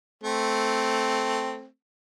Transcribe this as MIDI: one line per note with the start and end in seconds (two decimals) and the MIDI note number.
0.24 1.66 57
0.24 1.66 60